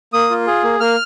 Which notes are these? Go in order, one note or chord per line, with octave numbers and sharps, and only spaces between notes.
A#3 D#6
F4
G#4
A#3
A#3 F6